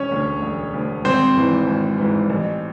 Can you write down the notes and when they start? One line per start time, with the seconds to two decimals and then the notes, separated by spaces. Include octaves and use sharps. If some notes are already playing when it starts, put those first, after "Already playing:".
Already playing: E1 C#4 C#5
0.12 D2 D3
0.42 E1
0.74 D2 D3
1.05 G#1 C4 C5
1.36 G#2 E3
1.67 G#1
1.98 G#2 E3
2.30 A1